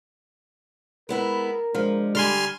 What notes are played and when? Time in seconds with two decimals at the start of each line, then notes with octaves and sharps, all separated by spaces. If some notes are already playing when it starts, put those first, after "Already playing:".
1.09 G#3 B3 E4 A#4
1.75 F3 G#3 D4
2.15 D3 G3 G#5 C6 F6